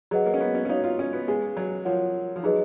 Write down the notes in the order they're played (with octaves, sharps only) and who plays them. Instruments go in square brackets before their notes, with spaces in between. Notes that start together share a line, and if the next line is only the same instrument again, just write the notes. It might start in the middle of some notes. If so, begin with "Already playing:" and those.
[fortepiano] F#3 [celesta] G#4 B4 D#5 F#5
[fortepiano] A#3
C#4
B3
C#4
C#4
[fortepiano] D#4 [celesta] F#4 C#5 F5
[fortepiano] F4
C#4
B3
[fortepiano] G#3 [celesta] G#4 B4 F5 G#5
[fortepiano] F#3
[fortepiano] F3 [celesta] F4 A#4 C#5 F#5
[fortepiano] F3
[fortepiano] F#3 [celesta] D#4 G#4 B4 D#5